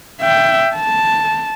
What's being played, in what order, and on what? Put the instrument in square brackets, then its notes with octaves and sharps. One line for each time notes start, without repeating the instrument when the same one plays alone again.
[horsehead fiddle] E5 G5
A5